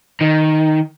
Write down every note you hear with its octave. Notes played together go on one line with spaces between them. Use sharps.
D#3